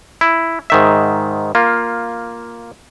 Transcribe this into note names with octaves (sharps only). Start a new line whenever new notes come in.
E4
G#2 D#3 E5
A#3 F4